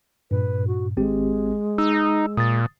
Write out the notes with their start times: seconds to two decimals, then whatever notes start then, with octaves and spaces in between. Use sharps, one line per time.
0.31 G2 A#2 B4
0.67 F#4
0.97 G#1 G#3 C4 G4
1.78 D#4 E6
2.37 A#2 D#6 A6